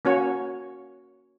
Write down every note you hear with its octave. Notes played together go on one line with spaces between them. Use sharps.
A#3 C#4 F#4 C#5